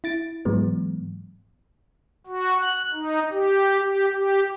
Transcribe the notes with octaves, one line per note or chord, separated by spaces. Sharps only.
E4 A6 D7
G#2 E3 F#3 G#3 B3
F#4
F#6
D#4
G4
G4
G4